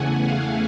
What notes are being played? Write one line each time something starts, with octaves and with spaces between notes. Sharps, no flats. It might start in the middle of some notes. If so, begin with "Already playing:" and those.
Already playing: E2 C#3 E3 A3 F#5 G#5
F5